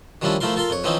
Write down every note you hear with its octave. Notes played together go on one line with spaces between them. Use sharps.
D#3 F3 G3 C#4 D4 E4
F3 A3 E4 F4 A#4 C6
F4 A4 A#4 C6
F2 C#5
E3 F3 C4 C#4 D#4 E4